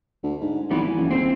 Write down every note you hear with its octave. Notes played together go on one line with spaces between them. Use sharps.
D2
G#2
G#1 E3 G3 B3
E3
F#1
D#1 C4 C5